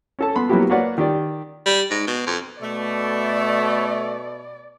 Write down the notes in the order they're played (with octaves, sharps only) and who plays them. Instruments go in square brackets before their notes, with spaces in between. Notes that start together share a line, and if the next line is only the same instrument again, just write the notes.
[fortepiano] C#4 A4 A5
B3 B5 C6
F#3 A#3 B3 E4 F#4 G4
A#3 F#4 B4 C#5 D5 F#5
D#3 G4 D5
[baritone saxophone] G3
G#2
B2
F2
[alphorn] B2 [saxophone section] A3 [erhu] D5